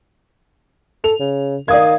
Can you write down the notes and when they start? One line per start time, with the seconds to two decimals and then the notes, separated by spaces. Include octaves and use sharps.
1.04 A4 F7
1.20 C#3
1.68 D#3 D5 F5 D#6 G#6